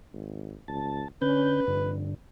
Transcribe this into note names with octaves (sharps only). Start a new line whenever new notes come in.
G#1
C#2 A5
D3 C#4 B4 G6
F1 G2 D3